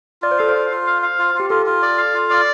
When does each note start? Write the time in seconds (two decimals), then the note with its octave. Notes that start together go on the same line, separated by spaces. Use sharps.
0.22 F4 D5
0.31 C5
0.38 A4 F5
0.49 C5
0.55 F4
0.70 F4
0.86 F5
1.02 F5
1.19 F4
1.34 F4
1.40 G4
1.50 F4 A4
1.66 F4
1.82 D5
1.98 F5
2.14 F4
2.30 D5